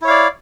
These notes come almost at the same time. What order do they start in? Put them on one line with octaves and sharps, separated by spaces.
E4 C#5 F5 D5